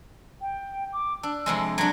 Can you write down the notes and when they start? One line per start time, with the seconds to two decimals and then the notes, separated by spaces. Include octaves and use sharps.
0.41 G5
0.93 D6
1.23 D4 E6
1.46 F2 C3 G#3
1.78 F#3 D4 G#6